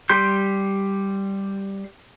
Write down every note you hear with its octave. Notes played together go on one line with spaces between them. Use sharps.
G3 G4 C6 G6